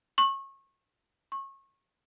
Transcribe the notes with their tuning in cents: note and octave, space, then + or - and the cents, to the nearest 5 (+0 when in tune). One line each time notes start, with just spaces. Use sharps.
C#6 -30
C#6 -30